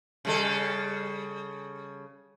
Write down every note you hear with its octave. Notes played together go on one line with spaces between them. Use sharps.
C#3 G3 A4